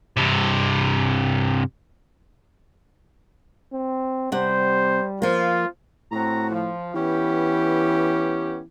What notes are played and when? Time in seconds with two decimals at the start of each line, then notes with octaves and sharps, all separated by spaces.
0.17 G2 C3
3.73 C4
4.32 C3 G3 C5 F#5
5.22 F3 A#3 F4
6.12 A2 C4 F#4 A#5
6.50 F3
6.94 E3 B3 C#4 G4